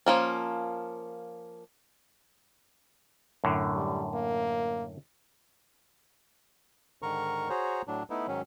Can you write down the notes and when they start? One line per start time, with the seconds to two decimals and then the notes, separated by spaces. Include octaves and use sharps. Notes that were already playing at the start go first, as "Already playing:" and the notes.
0.06 F3 A#3 C#4
3.44 F#2 A2 D3
3.75 G3
4.14 A#3
7.02 G#2 D3 D#3 A#4 A#5 C#6
7.50 F#4 G#4 C5 C#5 A#5
7.87 A2 F#3 D4
8.10 A3 B3 D#4 E4
8.27 G#2 D#3 F#3 C#4